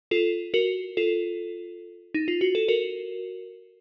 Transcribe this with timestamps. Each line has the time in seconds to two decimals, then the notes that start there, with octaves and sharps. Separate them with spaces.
0.11 F4 A4
0.54 F#4 A#4
0.97 F4 A4
2.14 D#4
2.28 F4
2.41 F#4
2.55 A4
2.68 F#4 A#4